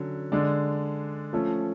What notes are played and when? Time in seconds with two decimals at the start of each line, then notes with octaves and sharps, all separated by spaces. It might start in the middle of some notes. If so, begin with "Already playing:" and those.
Already playing: D3 F#3 C#4
0.32 D3 G#3 D4
1.33 F3 A3 C#4